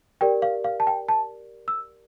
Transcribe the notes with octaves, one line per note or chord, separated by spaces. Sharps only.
G4 A#4 D5 G5
F5
F5
A5
G5
A5
E6